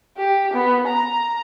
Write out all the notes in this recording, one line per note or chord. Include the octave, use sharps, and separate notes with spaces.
G4
B3
A#5